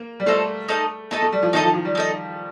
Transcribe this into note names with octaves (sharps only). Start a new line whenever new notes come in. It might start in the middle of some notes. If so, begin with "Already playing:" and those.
Already playing: A#3
G3
A3 F4 A4 C5 D#5
D#4 A4 D#5
A3 D#4 A4 D#5
A3
G3
F3
D#3 D#4 A4 D#5
F3
F3
G3
D#4 A4 D#5